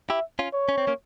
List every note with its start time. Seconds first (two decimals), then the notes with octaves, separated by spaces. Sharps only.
0.09 E4 G4 E5
0.39 C#4 F4
0.53 C#5
0.69 C#4
0.78 C4
0.87 A#3 C#4